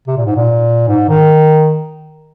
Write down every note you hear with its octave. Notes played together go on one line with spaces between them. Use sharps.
C3
A#2
G#2
A#2
G#2
D#3